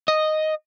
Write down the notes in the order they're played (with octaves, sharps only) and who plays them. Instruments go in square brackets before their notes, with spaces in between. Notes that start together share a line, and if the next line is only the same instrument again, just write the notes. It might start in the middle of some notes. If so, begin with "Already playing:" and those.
[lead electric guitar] D#5